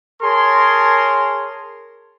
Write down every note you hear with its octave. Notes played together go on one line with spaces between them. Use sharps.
G#4 A#4 C#5 A5 C6